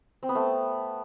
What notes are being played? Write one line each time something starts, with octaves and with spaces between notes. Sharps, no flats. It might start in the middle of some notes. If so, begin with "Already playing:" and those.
C4
B3
A3